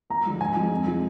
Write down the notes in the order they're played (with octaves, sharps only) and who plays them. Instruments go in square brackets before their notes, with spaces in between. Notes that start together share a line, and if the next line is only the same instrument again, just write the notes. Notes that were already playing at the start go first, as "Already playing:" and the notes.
[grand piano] D#2 A#5
D3 F3 G#3
G#2 G#5
F3 G#3
F2
C3 F3 G#3